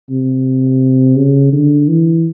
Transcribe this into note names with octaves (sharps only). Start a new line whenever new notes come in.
C3
C#3
D3
E3